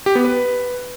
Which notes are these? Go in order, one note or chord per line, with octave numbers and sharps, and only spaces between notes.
G4
B3
B4